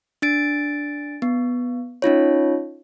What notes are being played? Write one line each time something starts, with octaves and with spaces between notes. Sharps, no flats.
D4 A6 D7
B3
C#4 D#4 F4 C#5